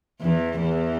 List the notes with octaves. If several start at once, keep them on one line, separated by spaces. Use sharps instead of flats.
E2 E3
E2 E3